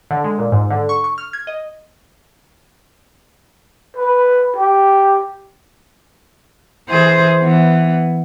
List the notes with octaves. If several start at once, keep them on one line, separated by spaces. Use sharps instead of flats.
D3
G#3
A#2
G#2
D3
C#6
C#6
F6
G#6
D#5
B4
G4
E3 G#4 C5
E3 B3